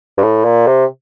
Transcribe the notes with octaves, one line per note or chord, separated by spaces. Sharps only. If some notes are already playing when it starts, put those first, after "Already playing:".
G2
A2
A#2
C3